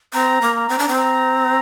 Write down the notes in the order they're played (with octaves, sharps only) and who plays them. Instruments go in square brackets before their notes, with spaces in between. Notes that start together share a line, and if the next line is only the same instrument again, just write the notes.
[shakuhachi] C4 [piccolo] A#5
[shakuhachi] A#3
[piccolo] A#5
[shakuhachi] C4
D4
C4
[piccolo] A#5